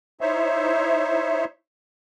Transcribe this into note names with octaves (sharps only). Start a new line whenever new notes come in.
D#4 E4 C5 C#5 E5